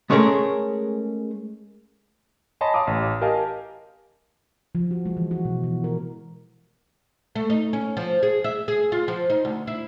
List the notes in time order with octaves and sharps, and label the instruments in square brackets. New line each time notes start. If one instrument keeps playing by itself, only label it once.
[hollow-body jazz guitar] G#3 A3 C#4 G#4 A#4
[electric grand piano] C#5 D#5 G#5 A5 B5 C6
F5 A#5 D6 D#6
A1
G4 A#4 D#5 F5 G#5 A5
[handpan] F3
F#4
G#3
E3
F#4
B2
E3
A#4
[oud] A3
D#4
C#4
F3
G#4
E5
G#4
F4
F3
D#4
D2
E4